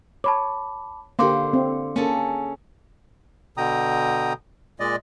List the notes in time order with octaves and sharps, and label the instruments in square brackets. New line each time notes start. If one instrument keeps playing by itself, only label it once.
[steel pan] C#5 [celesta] A5 B5 D6
[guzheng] D3 C5 [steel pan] A#3 G4 [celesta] F5 C6 D6
[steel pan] C4
[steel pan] A#3 [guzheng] C#4 G#4 A4
[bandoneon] B2 D3 G5 A#5 D#6
A#2 G#3 D5 D#5